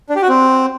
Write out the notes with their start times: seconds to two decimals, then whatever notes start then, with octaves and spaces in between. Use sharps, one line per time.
0.09 D4
0.16 G4
0.22 F#4
0.29 C4